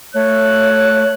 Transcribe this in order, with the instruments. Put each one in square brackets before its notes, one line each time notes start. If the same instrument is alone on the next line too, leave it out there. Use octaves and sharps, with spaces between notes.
[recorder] A3 [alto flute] C#5 [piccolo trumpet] F#6